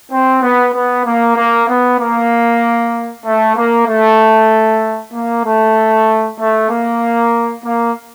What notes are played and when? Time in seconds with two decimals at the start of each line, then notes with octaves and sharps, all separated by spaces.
0.11 C4
0.42 B3
0.74 B3
1.05 A#3
1.37 A#3
1.68 B3
1.99 A#3
3.25 A3
3.56 A#3
3.87 A3
5.13 A#3
5.45 A3
6.39 A3
6.70 A#3
7.65 A#3